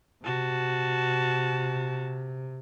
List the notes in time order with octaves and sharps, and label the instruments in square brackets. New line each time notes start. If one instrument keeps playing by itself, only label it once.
[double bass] C3 [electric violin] F#4 A5